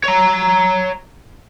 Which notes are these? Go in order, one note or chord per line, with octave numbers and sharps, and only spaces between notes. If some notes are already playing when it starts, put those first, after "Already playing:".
C#5 A#5